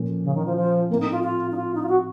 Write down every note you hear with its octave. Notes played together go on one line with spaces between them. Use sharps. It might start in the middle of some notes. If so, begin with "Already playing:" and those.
Already playing: A#2 F3 A#3 C#4 A4
C#3
D#3
F3
F3
A2 A3 A#3 C4
D#4
F4
F4
D#4
F4
D#4
F4
F#4